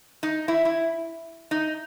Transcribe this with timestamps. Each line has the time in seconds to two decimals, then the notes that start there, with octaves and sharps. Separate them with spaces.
0.23 D#4
0.48 E4
0.65 E4
1.51 D#4